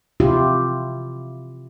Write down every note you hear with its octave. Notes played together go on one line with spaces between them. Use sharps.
C3 E4 F4 G4